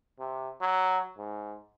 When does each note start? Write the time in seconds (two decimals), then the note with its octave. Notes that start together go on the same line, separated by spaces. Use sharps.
0.20 C3
0.61 F#3
1.17 G#2